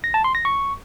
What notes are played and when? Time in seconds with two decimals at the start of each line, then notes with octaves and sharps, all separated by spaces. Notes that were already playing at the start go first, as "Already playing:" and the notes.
0.04 A#6
0.14 A5
0.24 C6
0.35 A#6
0.45 C#6